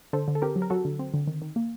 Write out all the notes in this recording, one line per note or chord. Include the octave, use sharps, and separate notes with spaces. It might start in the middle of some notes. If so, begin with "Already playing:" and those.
D3 A4 C5
D3
A4
C4 G4 A#4
F#3
A#4
F#3 F#4 A4
D3
C4
D3
D#3
D#3
A#3